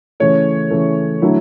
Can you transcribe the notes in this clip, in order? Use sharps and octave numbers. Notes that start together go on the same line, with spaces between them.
C#3 E3 A3 C#5
C#3 E3 A3
D3 F#3 A3 E4